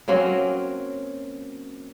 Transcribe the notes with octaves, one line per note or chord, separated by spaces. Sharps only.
F#3 A#3 C4 C#4